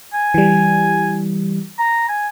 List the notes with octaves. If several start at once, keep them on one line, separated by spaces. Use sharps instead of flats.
G#5
E3 G3
A#5
G#5